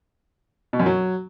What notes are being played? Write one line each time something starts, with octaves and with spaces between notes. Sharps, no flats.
B2
F#2
F#3